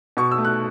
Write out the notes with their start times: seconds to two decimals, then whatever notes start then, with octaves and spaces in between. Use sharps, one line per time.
0.17 B2 C#6
0.31 E6
0.38 A3
0.45 F#6